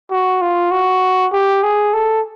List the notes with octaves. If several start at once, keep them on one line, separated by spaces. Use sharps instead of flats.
F#4
F4
F#4
G4
G#4
A4